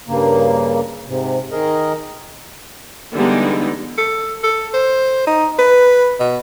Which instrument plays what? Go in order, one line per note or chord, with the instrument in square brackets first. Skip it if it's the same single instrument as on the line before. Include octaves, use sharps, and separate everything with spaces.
[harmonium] G2 C#3 A#3
G#2 C3
D#3 G#4 A#4 D#5
[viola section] D3 E3 G3 G#3 B3 D#4
[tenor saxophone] A4
A4
C5
D#4
B4
B2